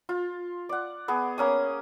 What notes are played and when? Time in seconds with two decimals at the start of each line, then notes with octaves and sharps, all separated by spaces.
0.09 F4
0.69 D5 F#5
1.08 B3 G#4
1.38 A#3 C#4 D#6